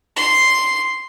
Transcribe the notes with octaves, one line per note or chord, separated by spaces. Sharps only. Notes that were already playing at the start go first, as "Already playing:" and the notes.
C6